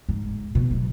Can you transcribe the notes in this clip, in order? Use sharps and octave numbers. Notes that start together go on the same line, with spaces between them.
G#2
B2
F#3